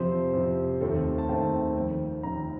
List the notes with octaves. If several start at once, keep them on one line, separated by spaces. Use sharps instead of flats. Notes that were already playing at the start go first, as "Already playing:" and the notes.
Already playing: F2 C3 F3 C4 C5
F2 C3 F3 C4
D#2 D#3 A3 C4 A4
A5
D#2 D#3 A3 C4 G5
F1 F2 D#3
F1 F2 D#3 A#5